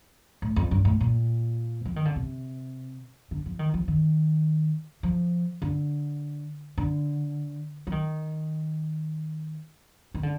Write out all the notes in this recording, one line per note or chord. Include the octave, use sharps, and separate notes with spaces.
A2
F2
G2
A2
A#2
F3
D#3
D3
C3
D3
F3
D#3
F3
D#3
F3
D3
D3
F3
D#3
D#3
D3